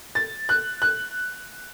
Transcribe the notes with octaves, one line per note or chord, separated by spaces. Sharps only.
A6
F#6
F#6